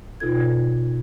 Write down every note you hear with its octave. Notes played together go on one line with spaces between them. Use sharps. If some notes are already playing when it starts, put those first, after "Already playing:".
B2 D#4 F4 A4 G#6